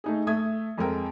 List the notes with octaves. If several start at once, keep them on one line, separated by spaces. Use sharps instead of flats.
A3 D#4 G#4
A3 E5 D#6 G#6
F2 G#3 A4 A#4 G5